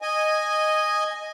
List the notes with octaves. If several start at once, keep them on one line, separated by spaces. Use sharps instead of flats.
D#5 G#5